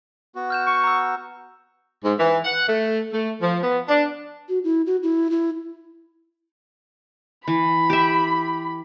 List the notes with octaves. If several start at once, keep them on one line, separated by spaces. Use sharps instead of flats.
B3 F#4
F6 G6 E7
C#6
A#5 E6
G#2
E3
F#5
A3
A3
F3
B3
D4
F#4
E4
F#4
E4
E4
E3 B5
G4 E5